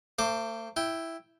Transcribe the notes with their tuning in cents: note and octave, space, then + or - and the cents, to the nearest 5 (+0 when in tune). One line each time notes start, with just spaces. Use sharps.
A3 +45 C5 +0 D6 +0
E4 +0 G5 +0